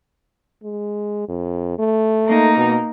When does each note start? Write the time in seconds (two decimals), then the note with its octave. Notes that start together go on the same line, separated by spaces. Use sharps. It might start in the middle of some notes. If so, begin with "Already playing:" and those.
0.63 G#3
1.29 F2
1.79 A3
2.26 A#3 D#4
2.57 B2